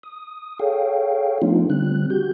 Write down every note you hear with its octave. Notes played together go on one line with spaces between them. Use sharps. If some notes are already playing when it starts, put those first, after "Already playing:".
D#6
G#4 A4 C#5 F5 G5
F3 A3 B3 D4 D#4 F4
D3 G3 C4 F#6
F#4 G4 G6